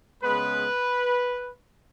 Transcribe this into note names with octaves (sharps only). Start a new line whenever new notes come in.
C#3 G#3 B3 B4